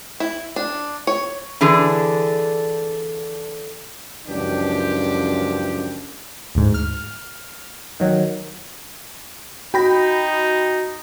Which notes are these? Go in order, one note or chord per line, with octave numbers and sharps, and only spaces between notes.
E4
D4
C#5
D3 E3 D4 G#4
C#2 F#2 E3 F3 D4 G4
D2 G#2
F6
D#3 F#3
D#4 F#4 G5 B5 A#6